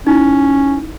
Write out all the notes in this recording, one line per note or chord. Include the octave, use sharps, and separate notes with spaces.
C#4 D#4 E4